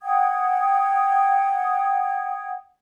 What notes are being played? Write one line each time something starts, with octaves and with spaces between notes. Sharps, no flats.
F#5 G5 D#6 G#6